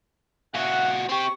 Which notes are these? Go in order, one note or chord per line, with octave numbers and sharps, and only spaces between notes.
A#2 F#4 E5 F#5
C4 G4 C#6